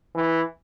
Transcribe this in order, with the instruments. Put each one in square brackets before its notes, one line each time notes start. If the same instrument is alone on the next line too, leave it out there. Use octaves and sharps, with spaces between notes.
[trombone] E3